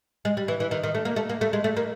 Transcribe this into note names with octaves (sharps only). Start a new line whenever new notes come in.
G#3
G3
E3
E3
D#3
D#3
A3
A#3
A3
A#3
A3
G#3
A3
A#3